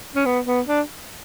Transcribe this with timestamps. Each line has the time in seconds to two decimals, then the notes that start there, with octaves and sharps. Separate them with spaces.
0.15 C#4
0.25 B3
0.46 B3
0.67 D4